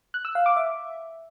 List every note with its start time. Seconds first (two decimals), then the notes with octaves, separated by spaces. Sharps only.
0.14 F#6
0.25 E6
0.35 F5
0.46 D6
0.56 E5